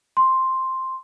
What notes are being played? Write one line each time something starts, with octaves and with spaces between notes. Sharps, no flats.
C6